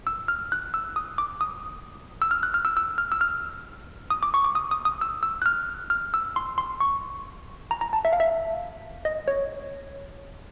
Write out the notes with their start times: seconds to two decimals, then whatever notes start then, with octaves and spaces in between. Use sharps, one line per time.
0.07 E6
0.28 F6
0.52 F#6
0.74 E6
0.96 D#6
1.18 D6
1.41 D#6
2.22 E6
2.31 F6
2.43 F#6
2.54 F6
2.65 E6
2.77 E6
2.98 F6
3.12 E6
3.21 F6
4.10 D#6
4.23 D6
4.34 C#6
4.44 D6
4.55 D#6
4.71 D#6
4.85 D#6
5.01 E6
5.23 E6
5.42 F#6
5.46 F6
5.90 F6
6.14 E6
6.36 C6
6.58 C6
6.80 C#6
7.71 A#5
7.81 A#5
7.93 A5
8.05 E5
8.13 F5
8.20 E5
9.05 D#5
9.28 C#5